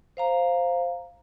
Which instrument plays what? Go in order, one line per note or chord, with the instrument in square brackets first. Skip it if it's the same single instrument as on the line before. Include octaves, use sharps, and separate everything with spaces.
[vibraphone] C5 F5 A#5